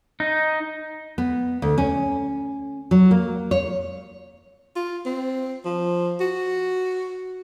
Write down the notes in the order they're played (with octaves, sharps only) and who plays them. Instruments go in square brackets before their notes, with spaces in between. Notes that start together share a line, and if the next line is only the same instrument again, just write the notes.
[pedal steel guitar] D#4
[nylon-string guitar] B3
D2
C#4
F#3
A#3
C#5
[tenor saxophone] F4
C4
F3
F#4